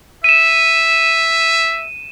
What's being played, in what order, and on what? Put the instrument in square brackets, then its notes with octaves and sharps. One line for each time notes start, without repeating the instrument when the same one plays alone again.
[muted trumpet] E5 [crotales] D#7 E7